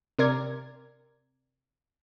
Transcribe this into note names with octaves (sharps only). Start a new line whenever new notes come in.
C3 A#4 D5 G#6